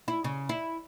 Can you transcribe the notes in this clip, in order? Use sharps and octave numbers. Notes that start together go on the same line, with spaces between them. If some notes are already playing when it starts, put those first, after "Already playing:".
E4
C#3
E4